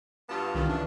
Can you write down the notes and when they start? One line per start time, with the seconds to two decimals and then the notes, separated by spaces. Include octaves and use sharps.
0.29 G2 B3 F4 A5
0.55 C2 D#3 C#4
0.69 C#3 E3 D4